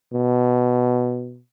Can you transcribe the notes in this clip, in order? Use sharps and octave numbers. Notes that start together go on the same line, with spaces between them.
B2